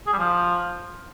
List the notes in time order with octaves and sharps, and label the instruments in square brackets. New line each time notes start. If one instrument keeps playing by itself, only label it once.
[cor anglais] G#4
G3
F3